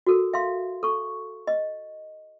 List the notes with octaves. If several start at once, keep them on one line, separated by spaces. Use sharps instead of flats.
F#4 A4 A#4
E5 F5 C6
A4 C#6
D#5